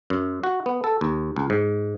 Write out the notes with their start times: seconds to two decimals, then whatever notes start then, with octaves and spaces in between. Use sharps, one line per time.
0.10 F#2
0.44 F#4
0.66 B3
0.84 A4
1.01 D#2
1.36 C#2
1.50 G#2